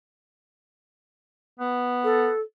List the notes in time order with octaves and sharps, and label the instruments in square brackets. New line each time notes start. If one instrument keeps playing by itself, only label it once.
[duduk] B3
[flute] A4